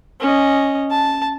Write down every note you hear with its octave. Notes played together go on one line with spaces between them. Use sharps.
C#4 D#5
A5